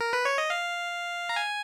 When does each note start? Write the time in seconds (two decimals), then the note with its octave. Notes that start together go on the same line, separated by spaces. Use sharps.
0.01 A#4
0.13 B4
0.25 C#5
0.38 D#5
0.50 F5
1.29 A#5
1.36 G#5